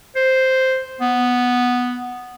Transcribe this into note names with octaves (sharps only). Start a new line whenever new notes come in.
C5
B3